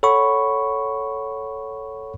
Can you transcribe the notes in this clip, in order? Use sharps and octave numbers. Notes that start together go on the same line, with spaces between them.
A4 C#5 F#5 B5 C#6